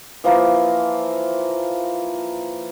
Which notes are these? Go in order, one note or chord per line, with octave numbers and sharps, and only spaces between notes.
E3 F3 A#3